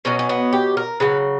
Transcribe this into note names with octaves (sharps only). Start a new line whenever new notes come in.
B2 F#3 C#4
C#4
B3
G4
A#4
C#3 F#3 B4